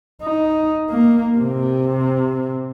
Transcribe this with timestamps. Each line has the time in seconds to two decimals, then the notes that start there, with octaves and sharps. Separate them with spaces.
0.22 D#4
0.90 A#3
1.38 C3